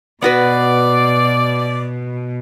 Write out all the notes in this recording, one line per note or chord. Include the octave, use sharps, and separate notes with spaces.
B2 B3 F#4 B4 D5